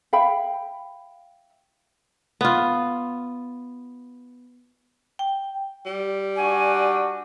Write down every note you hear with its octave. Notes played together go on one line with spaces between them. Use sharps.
E5 F5 G5 B5
B3 F4
G5
G3
D4 F#4 G#5